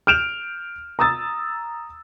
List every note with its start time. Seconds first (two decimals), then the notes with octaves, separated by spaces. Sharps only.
0.07 F6 G6 D7 E7 F7
0.99 A#5 D#6 E6 A6